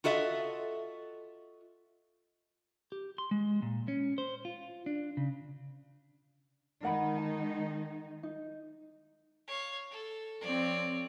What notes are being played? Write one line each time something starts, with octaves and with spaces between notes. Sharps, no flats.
F4 F#4 A4 D#5 E5
G4
C6
G#3
A#2
C#4
C5
F4
D4
C#3
D#3 G#3 D#4 A#4 F#5 B5
A5
D#4
C#5 F5
A4
F3 C4 C#5 D5